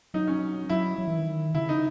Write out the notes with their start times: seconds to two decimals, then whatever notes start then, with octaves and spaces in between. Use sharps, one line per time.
0.14 F#3 D#4
0.27 C#4
0.69 F#3 E4
0.98 F#3
1.08 E3
1.17 D#3
1.54 C#3 E4
1.69 D#4